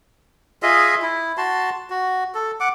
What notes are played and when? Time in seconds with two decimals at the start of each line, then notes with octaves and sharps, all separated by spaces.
0.63 F4 G#4 D#5 E5
1.02 E4
1.38 F#4 A5 C6
1.90 F#4
2.35 A4
2.60 F#5 D6